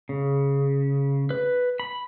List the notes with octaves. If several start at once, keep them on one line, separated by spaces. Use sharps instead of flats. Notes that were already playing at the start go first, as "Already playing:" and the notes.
C#3
B4
B5